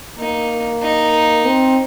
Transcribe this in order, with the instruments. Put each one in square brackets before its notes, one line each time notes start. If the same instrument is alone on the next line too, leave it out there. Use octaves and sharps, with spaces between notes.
[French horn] A#3 [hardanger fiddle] D#4
[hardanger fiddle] D#4
[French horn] C4